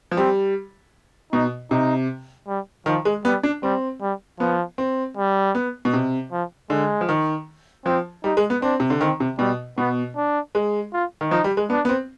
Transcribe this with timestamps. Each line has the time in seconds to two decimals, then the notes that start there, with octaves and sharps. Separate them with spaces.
0.11 F3
0.17 G3 C4
1.32 B2 D#4
1.71 C3 D#4
2.48 G3
2.86 D#3 F3
3.05 G#3
3.25 G3 B3
3.43 D4
3.63 G3 C4
4.01 G3
4.40 F3 B3
4.78 C4
5.17 G3
5.55 B3
5.85 B2
5.93 C3
6.32 F3
6.70 D3 G#3
7.01 F3
7.09 D#3
7.86 F3 C4
8.24 G3 D#4
8.37 G#3
8.50 B3
8.62 C4 D4
8.80 C3
8.90 D3
9.01 D#3 C4
9.20 C3
9.39 B2 G3
9.78 B2 B3
10.16 D4
10.55 G#3
10.93 F4
11.21 D#3
11.31 F3 D#4
11.44 G3
11.57 G#3
11.70 B3 D4
11.85 B3
11.89 C4